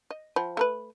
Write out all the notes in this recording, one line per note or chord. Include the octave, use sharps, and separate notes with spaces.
D#5
F3 G5 B5
A3 A#4 B4